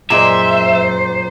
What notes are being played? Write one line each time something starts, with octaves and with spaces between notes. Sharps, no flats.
F#2 A#2 G#3 C5 E5 A#5